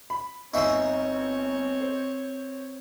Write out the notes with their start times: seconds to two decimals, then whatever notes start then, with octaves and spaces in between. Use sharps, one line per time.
0.10 B5
0.54 G1 C4 D#4 C#5 E5 G#5 C6 C#6
1.81 C5